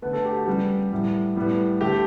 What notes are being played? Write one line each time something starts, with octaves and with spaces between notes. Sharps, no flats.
D3 A3 B3 B4
A3 A4
G4
F#4
C#3 G3 B3 G4
A2 G3 B3
A2 G3 B3
D3 A3 G4